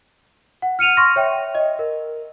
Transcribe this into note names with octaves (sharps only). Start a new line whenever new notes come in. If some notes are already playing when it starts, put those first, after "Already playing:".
F#5
F6 C#7 D#7 F7
C6 C#6 F6 A#6
C#5 E5 G5
D#5
A#4